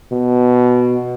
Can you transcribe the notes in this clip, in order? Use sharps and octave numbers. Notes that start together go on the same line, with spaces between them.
B2